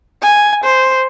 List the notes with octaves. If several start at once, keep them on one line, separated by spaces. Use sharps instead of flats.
G#5
C5